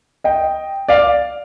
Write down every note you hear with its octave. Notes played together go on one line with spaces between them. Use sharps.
D#5 G5
D5 F5